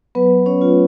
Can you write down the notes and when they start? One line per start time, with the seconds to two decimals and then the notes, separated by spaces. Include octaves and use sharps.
0.15 F#3 B3 B4
0.46 C#4 C#5
0.62 A3 F4